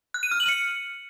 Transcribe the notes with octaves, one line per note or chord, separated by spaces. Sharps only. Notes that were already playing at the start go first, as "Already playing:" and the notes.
F#6
D#7
F6
F#7
C#7